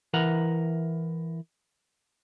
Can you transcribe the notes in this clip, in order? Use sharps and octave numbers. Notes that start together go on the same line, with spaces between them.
E3 A#4 F#5 A#5